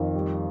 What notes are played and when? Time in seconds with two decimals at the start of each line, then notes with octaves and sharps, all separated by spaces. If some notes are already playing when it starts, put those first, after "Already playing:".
Already playing: F2 D#3
0.15 G3